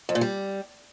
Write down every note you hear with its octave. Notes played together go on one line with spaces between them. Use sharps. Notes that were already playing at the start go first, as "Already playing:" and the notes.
F2
A#2
G3